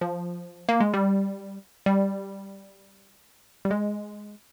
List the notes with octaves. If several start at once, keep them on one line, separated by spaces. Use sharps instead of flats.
F3
A#3
G#3
G3
G3
G3
G#3